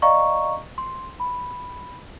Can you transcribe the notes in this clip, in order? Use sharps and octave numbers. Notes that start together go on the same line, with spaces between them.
D5 D#5 F5 A#5 C#6
C6
B5